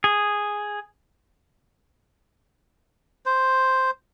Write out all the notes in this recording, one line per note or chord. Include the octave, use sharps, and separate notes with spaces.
G#4
C5